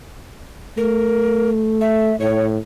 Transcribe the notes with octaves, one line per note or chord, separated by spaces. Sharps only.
A3 A#4
E5
A2 C#5